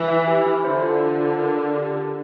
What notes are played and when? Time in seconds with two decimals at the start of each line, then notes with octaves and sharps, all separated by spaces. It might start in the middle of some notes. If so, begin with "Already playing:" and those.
Already playing: E3
0.08 E5
0.27 G4
0.46 E4
0.64 D3 C5
0.83 F4
1.02 A4
1.20 F4
1.39 A#4
1.57 D5
1.76 G4
1.95 D4